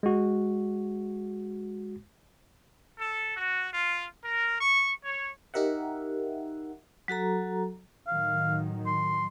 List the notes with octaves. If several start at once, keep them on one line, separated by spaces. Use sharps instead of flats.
G#3 F#4
A4
F#4
F4
A#4
C#6
C#5
D#4 G4 A#4 E5 F#5
F#3 F#4 A4 A#5
A2 D#3 F#3 F5
C6